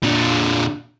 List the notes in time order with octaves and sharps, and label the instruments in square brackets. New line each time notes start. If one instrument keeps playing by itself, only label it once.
[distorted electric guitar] A#2 D3